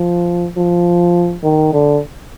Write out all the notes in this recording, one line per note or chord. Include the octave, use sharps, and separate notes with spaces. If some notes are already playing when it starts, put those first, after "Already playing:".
Already playing: F3
F3
D#3
D3